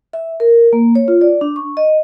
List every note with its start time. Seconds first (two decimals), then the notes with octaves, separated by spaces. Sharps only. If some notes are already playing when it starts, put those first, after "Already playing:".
0.13 E5
0.40 A#4
0.73 A#3
0.95 C#5
1.08 F4
1.21 D5
1.41 D4
1.56 C#6
1.77 D#5